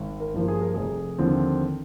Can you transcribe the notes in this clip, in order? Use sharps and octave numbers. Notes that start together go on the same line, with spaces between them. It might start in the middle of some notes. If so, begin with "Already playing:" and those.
Already playing: G#1
A#4
G2 F3 A#3
G#4
A#4
F1 G#4
D#2 D3 F3 C4